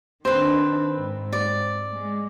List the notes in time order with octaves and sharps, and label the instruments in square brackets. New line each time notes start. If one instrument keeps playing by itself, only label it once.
[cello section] D#3 D4 [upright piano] C4 [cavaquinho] B4 C5
[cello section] G#2
[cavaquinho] D5
[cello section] G#3